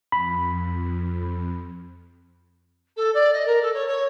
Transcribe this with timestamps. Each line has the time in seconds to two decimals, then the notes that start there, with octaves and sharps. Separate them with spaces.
0.12 F2 B5
2.97 A4
3.14 D5
3.33 D#5
3.46 A#4
3.62 A4
3.74 C#5
3.88 C#5